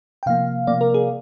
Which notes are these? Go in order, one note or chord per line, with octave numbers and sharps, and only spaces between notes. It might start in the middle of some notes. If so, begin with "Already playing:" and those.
G5
C3 F3 A#3 F5
C3 F3 A#3 D5
A#4
G#4